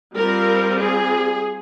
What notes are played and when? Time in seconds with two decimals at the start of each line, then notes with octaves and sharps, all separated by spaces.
0.15 G3 C4 F4 A#4
0.79 G#4